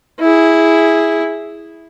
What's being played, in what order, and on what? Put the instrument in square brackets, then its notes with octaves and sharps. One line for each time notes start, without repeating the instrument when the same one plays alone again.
[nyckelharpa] E4 G#4